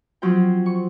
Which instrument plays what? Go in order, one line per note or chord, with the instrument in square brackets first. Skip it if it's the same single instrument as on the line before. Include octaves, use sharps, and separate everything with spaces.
[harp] F3 F#3 C4 F4 G5
C#6